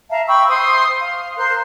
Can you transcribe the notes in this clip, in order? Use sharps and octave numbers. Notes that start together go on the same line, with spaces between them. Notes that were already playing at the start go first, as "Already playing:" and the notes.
E5 F5 A5 A#5
G5 B5 C#6 E6
C5 C6 D#6
F5
A#4 C5 C6 F#6